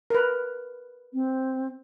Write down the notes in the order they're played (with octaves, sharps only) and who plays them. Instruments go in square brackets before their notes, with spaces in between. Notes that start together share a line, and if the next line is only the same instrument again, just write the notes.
[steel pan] A#4 B4
[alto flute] C4